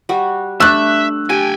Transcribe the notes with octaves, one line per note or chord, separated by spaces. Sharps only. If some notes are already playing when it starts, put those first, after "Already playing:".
G3 F#4
A3 D4 E5 C#6 E6 F#6
G4 G5 G#5